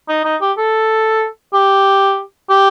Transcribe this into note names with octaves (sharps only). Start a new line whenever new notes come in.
D#4
D#4
G4
A4
G4
G4